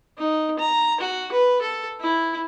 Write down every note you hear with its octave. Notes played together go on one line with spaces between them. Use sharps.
D#4
A#5
F#4
B4
A4
E4